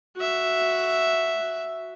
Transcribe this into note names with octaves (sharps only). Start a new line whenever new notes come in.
F#4 E5